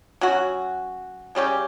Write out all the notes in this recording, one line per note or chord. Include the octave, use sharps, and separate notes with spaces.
F#3 C#4 F#4
C#3 G3 C#4 G4